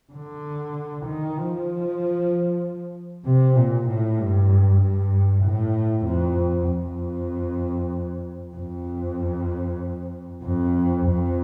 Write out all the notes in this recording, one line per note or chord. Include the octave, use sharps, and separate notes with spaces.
D3
D#3
F3
C3
A#2
A2
G2
G2
A2
F2
F2
F2
F2
F2